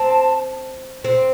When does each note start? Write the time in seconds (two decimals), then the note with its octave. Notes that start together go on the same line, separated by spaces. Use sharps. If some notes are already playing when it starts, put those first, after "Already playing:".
Already playing: C4 A5
1.04 C4